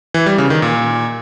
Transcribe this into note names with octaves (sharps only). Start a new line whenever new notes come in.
E3
G3
C#3
D#3
A#2